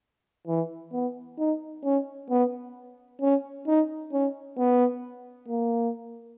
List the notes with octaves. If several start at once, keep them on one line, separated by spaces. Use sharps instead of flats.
E3
B3
D#4
C#4
B3
C#4
D#4
C#4
B3
A#3